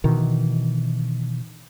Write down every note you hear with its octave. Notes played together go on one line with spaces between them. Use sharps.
B2 D#3 E3